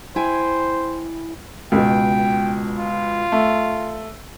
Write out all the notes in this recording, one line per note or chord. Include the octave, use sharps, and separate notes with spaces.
E4 C5 G5 G#5
C#2 B2 G5
F4
A3